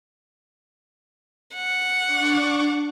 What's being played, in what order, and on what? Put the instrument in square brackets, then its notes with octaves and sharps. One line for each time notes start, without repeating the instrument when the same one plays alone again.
[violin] F#5
[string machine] D4 C#6 D6